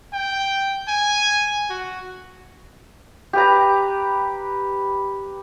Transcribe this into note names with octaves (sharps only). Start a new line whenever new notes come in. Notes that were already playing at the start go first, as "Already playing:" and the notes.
G5
G#5
F#4
G4 B4 A#5